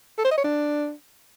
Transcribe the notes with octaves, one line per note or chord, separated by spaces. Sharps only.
A4
C5
D#5
C#5
D4